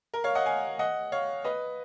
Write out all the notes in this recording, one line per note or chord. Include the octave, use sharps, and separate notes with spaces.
A#4
C#5 F5
D#5 F#5
F5 G#5
D#5 F#5
C#5 F5
B4 D#5